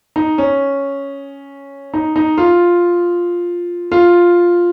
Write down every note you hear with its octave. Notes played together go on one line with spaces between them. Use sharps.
D#4
C#4
D#4
D#4
F4
F4